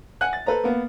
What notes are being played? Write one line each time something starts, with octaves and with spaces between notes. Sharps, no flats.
F#5 G#5 F#6
A6
A4 B4 C5 A#5
A#3 B3